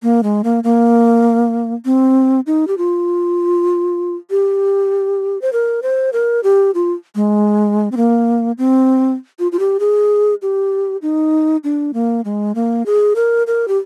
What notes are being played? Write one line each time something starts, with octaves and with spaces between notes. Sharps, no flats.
A#3
G#3
A#3
A#3
C4
D#4
G4
F4
G4
C5
A#4
C5
A#4
G4
F4
G#3
C4
A#3
C4
F4
F4
G4
G#4
G4
D#4
D4
A#3
G#3
A#3
G#4
A#4
A#4
G4